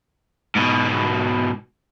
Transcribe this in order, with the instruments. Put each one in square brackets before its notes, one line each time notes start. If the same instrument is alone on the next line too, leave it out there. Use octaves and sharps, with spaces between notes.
[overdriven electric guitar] G#2 B2